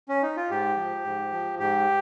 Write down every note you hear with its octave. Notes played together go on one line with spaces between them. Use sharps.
C#4
D#4
F4
G#2 G4
F3
G#2
F3
G#2 G4